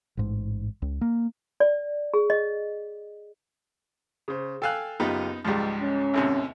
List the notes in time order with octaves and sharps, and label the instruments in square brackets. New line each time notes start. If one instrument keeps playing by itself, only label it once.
[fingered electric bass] A1 G#2
C#2
A#3
[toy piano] D5
G#4
D#5
[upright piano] C#3 C5
[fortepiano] A4 F5 F#6 [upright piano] G5 G#5 E6
[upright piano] F#1 F4 G4 [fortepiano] B3 D#4
[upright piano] C#2 G#2 [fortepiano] F3 G3
[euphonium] C#4
[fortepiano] A1 D#2 C3